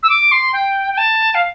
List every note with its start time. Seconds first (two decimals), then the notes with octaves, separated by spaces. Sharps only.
0.03 E6
0.09 D6
0.32 C6
0.53 G5
0.92 G5
0.98 A5
1.35 F5